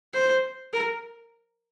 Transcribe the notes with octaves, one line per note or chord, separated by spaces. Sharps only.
C5
A#4